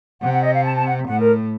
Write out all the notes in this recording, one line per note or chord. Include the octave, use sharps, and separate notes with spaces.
C3 F#5
F#5
D#5
F5
A5
A5
F#5
A2 F#5
A#4